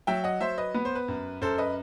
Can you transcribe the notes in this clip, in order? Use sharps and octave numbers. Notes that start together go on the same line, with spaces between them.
F#3 E5 G5
D#5 F#5
F#3 C5 E5
B4 D#5
B3 B4
C5
B4
F#2
F#2 A4 C5
B4 D#5